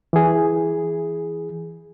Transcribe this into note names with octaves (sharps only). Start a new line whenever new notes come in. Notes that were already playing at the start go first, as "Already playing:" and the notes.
E3 G#4